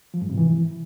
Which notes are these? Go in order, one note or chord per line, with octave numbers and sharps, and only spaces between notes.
F3
G#2
C3
E3